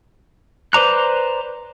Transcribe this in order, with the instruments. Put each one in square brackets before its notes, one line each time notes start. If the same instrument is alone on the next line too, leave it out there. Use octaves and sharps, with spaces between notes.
[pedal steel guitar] B4 C5 D5 A#5 F#6